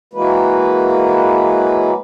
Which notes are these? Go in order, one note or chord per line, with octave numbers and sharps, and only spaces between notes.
E3 F#3 G#3 A#3 B4